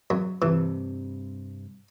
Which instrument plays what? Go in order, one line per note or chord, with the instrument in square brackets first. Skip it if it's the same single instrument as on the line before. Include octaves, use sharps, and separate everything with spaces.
[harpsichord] F#2
[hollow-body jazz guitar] G2 C3 [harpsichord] E3